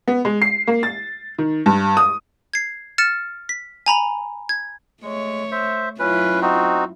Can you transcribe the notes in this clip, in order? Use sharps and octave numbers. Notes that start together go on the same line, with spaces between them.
B3
G#3
C7
A#3
A6
D#3
G2
D#6
G#6 C7
F6 A6 C#7 E7
B6
G#5 A#5 B5 F7
G#6
G#3 A3 C#5
C5 E5
F#2 C#4 E4 F4 B4
C4 D#4 F#4